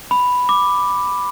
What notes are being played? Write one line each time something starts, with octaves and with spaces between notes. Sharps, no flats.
B5
D6